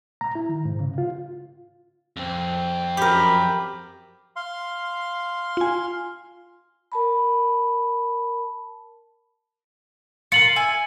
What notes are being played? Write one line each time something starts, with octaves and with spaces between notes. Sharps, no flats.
A#5
E4
D#3
G#2
C#3
F4
F2 C4
F#2 G4 A#4 B5
F5 C6
F4 G#5
A#4 A5 B5
F4 A#4 C#7 F#7
E5 G#5